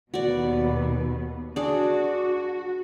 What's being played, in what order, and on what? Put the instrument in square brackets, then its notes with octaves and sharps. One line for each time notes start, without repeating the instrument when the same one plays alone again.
[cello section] D#2 B2 B3 [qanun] F#4 D5
[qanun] D4 G#4 [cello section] F#4